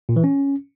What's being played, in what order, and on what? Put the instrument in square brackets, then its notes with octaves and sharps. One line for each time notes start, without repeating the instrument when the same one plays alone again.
[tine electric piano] A#2
E3
C#4